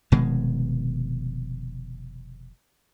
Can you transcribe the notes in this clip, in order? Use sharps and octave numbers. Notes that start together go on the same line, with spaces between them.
F1 B2 D#3 G#3